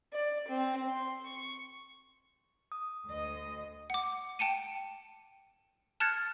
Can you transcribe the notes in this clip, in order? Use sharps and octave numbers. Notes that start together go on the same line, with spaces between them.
D5
C4
C6
C#6
D#6
D2 D#5
F#5 D6
G5 A5 C#7 D#7
A5 F6 F#6 G#6 A6 C#7